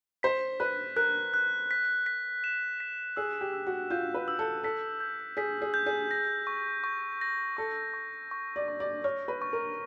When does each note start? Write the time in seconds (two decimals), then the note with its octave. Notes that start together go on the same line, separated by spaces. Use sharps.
0.23 C5 B6
0.60 B4 F#6
0.96 A#4 F#6
1.34 F#6
1.71 B6
2.06 B6
2.44 E7
2.80 B6
3.16 G#4 E6
3.41 G4
3.53 E6
3.67 F#4
3.90 F4 G6
4.14 B4
4.28 E6
4.39 A4
4.64 A4 B6
5.00 G6
5.37 G#4 B6
5.62 G#4
5.74 G6
5.86 G#4
6.11 A#6
6.47 C#6
6.84 C#6
7.21 A#6
7.57 A4 C#6
7.94 C#6
8.31 C#6
8.56 D5
8.68 C#6
8.80 D5
9.04 C#5 F6
9.28 B4
9.42 C#6
9.53 A#4